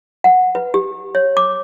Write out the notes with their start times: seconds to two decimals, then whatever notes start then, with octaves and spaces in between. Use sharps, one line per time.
0.24 F#5
0.55 B4
0.74 G4
1.15 C#5
1.37 D6